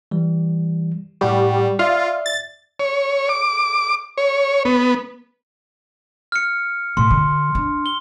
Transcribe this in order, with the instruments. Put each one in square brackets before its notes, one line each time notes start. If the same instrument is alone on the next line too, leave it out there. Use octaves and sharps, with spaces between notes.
[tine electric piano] E3 G3
[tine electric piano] A2 F#5 C#6 [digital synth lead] G3
[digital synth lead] F4 [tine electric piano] D5 E5
[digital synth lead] A6
[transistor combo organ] C#5
D6
C#5
B3
[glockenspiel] F6 C#7
[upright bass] A2 [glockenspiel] C6
[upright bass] D3
D4
[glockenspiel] G7